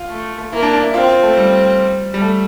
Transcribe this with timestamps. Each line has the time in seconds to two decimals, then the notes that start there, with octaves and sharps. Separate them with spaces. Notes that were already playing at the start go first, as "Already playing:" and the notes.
Already playing: F4
0.09 A3
0.53 A#3 E4
0.63 D4
0.73 D4
0.83 E4
0.94 C4 F4
1.09 F4
1.23 A3
1.37 G3
2.14 G3
2.21 A3